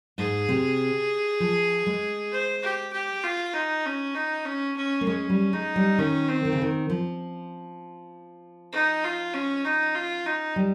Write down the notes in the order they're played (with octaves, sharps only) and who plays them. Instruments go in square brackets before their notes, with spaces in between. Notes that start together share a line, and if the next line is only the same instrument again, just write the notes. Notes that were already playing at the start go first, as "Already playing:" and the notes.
[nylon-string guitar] G#2 [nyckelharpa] G#4
[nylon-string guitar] C3
F3
G#3
[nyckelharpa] C5
G4
G4
F4
D#4
C#4
D#4
C#4
C#4
[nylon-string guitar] A#3
[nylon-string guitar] G#3 [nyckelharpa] C#4
[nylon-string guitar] G3
[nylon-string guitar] G#3 [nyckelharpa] D#4
[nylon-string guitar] G3
[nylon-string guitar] D#3 [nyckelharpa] C#4
[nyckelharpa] C4
[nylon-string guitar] D#3
C#3
D#3
F3
[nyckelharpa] D#4
F4
C#4
D#4
F4
D#4
[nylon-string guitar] G3